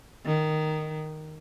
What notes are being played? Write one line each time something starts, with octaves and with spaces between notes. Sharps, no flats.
D#3